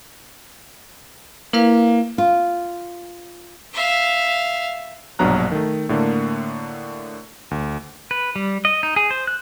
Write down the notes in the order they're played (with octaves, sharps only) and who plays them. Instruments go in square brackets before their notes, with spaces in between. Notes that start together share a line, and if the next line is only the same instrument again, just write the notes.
[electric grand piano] A#3 [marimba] E4 B4 F5
[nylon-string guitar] F4
[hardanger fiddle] E5 F5
[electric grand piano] A#1 G2 B2 F#3 A#5 F#6
D#3 A3
A2 D3 A3 A#3
D2
[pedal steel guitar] B4
G3
D#5
D#4
G#4
C5
F#6